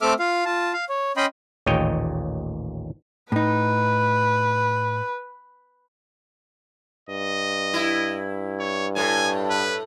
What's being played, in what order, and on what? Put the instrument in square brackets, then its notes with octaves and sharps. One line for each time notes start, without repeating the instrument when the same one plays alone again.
[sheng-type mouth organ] A3 C4 A4 E5 D6 F6
F4 F5
F4 A5
F5
C#5
C#4 D#5 G5 B5 C6
[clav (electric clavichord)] A1 D#2 A#2 C#5 D#5 G5
[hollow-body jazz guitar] A2 D#4 [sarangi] B4
[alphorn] G2 [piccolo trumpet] D#5
[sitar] E4
[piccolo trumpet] C#5
[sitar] A2 [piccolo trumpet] G#5
[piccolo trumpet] B4